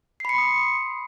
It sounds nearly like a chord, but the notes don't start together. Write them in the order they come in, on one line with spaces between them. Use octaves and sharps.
C7 B5 C#7 C6 D#6